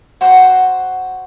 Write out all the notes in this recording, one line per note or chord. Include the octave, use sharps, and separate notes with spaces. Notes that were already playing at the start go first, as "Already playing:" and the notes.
F#4 C5 F#5 C6